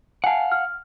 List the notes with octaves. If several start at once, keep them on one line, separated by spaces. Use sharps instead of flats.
F5 F#5 G#5 A5
F6